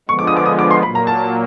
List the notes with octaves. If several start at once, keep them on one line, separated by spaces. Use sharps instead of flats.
D3 F3 G#3 B3 C#6
D6
D#6
D6
D#6
D6
C6
A#2 F#3 A#3 B5
A#5
A5